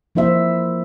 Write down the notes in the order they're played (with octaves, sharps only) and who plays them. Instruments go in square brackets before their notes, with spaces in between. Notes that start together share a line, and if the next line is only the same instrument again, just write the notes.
[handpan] F3 A#3 E4 C5 E5